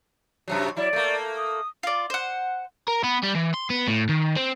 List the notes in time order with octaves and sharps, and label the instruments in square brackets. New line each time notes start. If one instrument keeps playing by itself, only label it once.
[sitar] F#2 C3 F#3
[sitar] F#3 E4 [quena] D5
[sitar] A3 A#3
[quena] D#6
[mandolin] F4 D5
C5 F#5
[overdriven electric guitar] A#4
B3
G3
E3
C6
B3
A2
D#3
C4